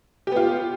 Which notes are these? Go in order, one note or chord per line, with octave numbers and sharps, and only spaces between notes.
B3 F4 G4